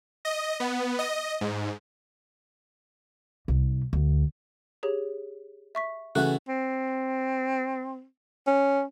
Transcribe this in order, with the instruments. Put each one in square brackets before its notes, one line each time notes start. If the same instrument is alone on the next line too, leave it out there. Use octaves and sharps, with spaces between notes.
[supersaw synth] D#5
B3
D#5
G#2
[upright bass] C2
D2
[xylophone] G4 G#4 C#5
E5 C#6 B6
[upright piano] C#3 C#4 A4 [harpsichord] E3 A3 F#4 [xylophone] F#6
[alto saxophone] C4
C#4